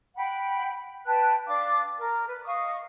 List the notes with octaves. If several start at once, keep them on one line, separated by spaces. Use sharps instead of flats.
F#5 G5 B5
B4 G5 A5 F#6
D4 F5 D6
A#4
B4
D#5 F5 C#6 D#6